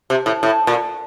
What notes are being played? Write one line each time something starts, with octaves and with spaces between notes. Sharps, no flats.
C3
A2
A2
A#2